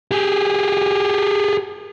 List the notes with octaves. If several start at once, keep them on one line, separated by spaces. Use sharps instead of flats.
G4 G#4